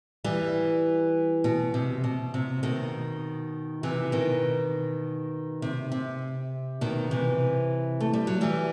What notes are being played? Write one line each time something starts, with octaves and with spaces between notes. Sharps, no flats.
E3 G3
B2
C3
B2
C3
B2 D#3
C3 E3
B2 D#3
C3
C3
B2 D#3
C3 E3
A3
G3
F#3
E3 G3